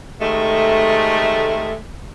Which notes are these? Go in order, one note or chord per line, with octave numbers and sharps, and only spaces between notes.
C3 D#3 G#3 A3